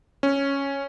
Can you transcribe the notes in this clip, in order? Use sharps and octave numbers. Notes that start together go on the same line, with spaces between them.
C#4